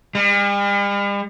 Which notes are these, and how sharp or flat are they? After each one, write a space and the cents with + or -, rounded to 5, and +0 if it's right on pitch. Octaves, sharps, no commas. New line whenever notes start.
G3 +45